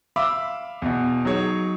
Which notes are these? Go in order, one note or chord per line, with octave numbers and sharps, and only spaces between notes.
E5 F5 B5 D6 E6
E2 B2
F#3 D#4 G#4 C#5